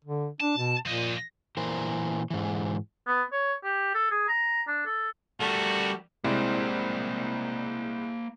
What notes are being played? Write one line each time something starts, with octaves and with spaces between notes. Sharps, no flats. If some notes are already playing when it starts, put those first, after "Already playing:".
D3
D4 A5
B2
A#2 F3 D#5
A#2 E3 A#4 C5
G#2 E3
B3
C#5
G4
A4
G#4
A#5
D4
A4
G3 A3 F#4 A#4
C2 G#3 A#3 C4 E4 C5 D5 C6